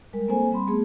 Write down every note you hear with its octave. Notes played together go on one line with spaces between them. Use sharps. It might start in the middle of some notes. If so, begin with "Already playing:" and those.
G3 G#3 A#4
A#3 C4 A4 C5 G#5
G3 C4 B5 C6
A3 B3 G#4